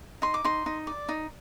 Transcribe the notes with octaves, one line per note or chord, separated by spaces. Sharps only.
D#4 C6
D6
D#4 C6
D#4
D5
D#4